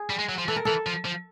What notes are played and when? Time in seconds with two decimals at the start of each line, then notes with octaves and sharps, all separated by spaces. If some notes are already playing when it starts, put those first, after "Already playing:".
Already playing: G#4
0.10 G3
0.19 G#3
0.29 F#3
0.38 F3
0.48 E3 A4
0.56 A#4
0.65 E3 A4
0.87 F3
1.05 F3